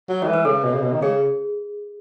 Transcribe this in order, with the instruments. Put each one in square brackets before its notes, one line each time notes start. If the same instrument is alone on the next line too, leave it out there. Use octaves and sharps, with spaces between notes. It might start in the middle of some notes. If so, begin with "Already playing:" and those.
[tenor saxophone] F#3
[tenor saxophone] D#3 [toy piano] C#5
[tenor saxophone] E3
[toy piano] B4
[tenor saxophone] C#3 [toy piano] A4
[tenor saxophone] B2
C#3
B2
D#3
[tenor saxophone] C#3 [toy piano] G#4